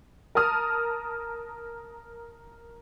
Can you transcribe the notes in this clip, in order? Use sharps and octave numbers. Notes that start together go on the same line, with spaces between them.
A#4 A5 A#5 D#6 F6